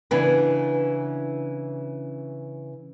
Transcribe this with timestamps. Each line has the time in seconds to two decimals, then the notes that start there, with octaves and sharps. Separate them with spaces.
0.11 C#3 E3 B3 D4